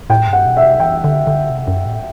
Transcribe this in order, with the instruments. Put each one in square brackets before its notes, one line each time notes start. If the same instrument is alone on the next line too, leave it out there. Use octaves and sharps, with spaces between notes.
[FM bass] A2 [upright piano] G5
[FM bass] G2
[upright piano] F#5
[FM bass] B2
[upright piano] E5
[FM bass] C3
[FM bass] E3 [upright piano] G5
[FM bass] D3
D3
C3
F#2
A2